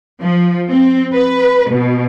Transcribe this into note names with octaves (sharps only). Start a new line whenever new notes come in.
F3
C4
B4
B2